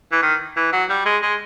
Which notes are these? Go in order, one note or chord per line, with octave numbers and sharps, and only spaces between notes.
E3
D#3
E3
F#3
G3
G#3
G#3